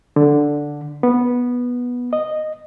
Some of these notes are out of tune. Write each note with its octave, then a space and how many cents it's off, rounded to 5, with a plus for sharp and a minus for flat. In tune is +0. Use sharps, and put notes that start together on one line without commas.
D3 +0
B3 -10
D#5 -10